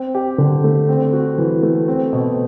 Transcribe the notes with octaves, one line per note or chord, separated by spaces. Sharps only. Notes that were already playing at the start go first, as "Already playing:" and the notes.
Already playing: C4
G4
D3
A3
C4
F#4
E3
A3
C4
B2